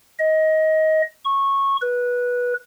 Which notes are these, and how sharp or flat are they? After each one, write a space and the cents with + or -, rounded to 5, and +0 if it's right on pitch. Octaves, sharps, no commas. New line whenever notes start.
D#5 +20
C#6 -15
B4 -15